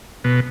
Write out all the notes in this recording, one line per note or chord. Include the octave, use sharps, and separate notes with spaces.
B2